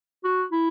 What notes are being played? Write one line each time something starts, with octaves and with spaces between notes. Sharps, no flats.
F#4
E4